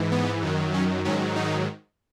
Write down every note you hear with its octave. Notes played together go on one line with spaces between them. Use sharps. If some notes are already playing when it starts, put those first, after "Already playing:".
Already playing: G#2 E3
B3
F#2 D#3 F#3
C#4
G#2 D#3 F#3 C#4
D#4